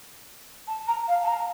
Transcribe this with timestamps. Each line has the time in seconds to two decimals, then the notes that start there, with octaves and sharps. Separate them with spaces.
0.67 A5
0.87 A#5
1.07 F5
1.23 A5
1.27 A#5